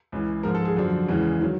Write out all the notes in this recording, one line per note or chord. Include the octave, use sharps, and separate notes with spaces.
C#2 C#3 E3
G#2 F3 G#3 A#4
A4
G#4
F#2 D3 F3
E2 C#3 E3 G#3
D#3 F#3